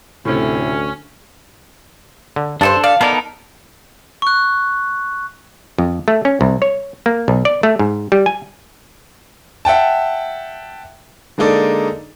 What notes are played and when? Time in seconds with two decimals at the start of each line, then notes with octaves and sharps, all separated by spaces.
0.25 D2 A2 C3 C#4
2.36 D3
2.61 G2 D4 A4 C5 D5 A5
2.84 D5 F5
3.01 B3 D#4 A4 A#4 D5 F5
4.22 C#6 F#6
5.78 F2
6.08 A3
6.25 C#4
6.41 C2
6.62 C#5
7.06 A#3
7.28 B1
7.45 D5
7.63 A3
7.79 G#2
8.12 G3
8.26 G#5
9.65 E5 F#5 G5 A5
11.38 D3 G#3 A#3 D#4 A4 D5